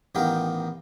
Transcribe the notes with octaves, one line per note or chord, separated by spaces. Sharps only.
A1 D#3 B3 G4 F5 G5